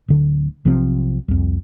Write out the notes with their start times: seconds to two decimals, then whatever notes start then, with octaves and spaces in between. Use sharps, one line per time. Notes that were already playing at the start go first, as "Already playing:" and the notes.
0.08 D1 D3
0.65 B1 C3 F3 C4
1.28 C2 F2